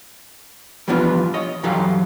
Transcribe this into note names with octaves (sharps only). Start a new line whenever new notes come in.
E3 F3 G3 B3 D4 F4
C#5 D#5
G2 E3 F#3 G4 A4 F5